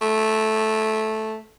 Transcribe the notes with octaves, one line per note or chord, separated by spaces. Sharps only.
A3